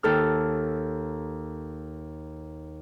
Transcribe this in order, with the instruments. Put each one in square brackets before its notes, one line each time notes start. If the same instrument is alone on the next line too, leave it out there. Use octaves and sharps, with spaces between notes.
[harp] D#2 A4 F6